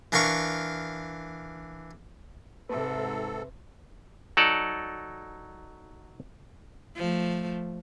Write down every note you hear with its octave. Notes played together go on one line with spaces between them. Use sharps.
E3 D4 A#4 F5 C#6
G#2 C3 A4 B4 E5
F#3 D#4 A4 D5
F3 A3